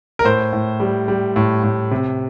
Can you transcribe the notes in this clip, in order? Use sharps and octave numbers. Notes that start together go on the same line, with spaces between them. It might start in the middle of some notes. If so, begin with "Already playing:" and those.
A#4
A2 C5
A2
G3
G3
A2
A2
C3